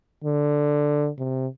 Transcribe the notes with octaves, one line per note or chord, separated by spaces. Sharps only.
D3
C3